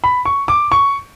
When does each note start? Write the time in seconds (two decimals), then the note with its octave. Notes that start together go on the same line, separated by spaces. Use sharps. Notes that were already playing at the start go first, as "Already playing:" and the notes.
0.04 B5
0.25 C#6
0.48 D6
0.72 C#6